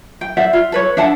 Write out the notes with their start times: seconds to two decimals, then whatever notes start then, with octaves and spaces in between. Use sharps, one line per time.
0.21 G5
0.37 C5 D5 E5 F#5
0.53 F4
0.72 A4 B4 C#5
0.97 D4 E5 F#5 A5